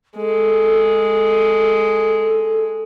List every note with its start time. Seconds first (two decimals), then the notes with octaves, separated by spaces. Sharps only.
0.17 G#3 A4